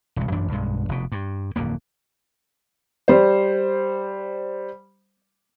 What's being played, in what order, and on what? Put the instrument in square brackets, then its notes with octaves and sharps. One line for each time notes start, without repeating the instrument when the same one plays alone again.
[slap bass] E1 C2
A1 F#2 E3 D4
B1 G2 G#3
F1 B2
G2
D1 F2 A#3
[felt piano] G3 C5